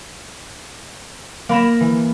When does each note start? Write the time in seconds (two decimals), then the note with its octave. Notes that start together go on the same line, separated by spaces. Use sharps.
1.49 A#3 B5 A#6 E7
1.80 E3